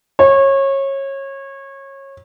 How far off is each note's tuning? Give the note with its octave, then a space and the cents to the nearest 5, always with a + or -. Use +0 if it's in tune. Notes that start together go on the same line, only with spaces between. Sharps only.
C#5 -25